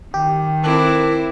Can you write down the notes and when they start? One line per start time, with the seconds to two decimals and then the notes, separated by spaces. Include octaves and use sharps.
0.14 D#3 G4
0.64 C4 E4 A4 A#4 D6 F#6